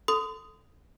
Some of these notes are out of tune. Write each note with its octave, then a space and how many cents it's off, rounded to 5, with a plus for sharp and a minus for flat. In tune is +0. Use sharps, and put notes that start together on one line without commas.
A4 +0 C6 -40 D#6 +5